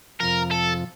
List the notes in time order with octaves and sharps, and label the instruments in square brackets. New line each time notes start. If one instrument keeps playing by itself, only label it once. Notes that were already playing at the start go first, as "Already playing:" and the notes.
[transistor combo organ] F2 C3 F3 [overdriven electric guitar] A#4
[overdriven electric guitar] A4